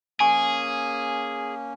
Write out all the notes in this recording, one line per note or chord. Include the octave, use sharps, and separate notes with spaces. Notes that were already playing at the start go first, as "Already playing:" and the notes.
A#3 C#4 G#4 G#5 C#6